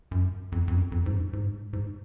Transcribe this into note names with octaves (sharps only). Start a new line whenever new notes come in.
F#2
F2
F2
F#2
F2
G#2
F#2
G#2
G#2